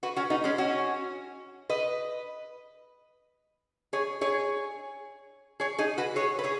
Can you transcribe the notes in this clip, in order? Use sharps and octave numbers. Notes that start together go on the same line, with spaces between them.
F#4 B4
C#4 F#4
B3 D#4
G#3 C#4
C#4 F#4
B4 D#5
G#4 C#5
G#4 C#5
G#4 C#5
D#4 G#4
F#4 B4
G#4 C#5
B4
G#4 C#5